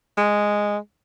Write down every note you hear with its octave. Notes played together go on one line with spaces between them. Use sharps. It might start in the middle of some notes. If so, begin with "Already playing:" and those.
G#3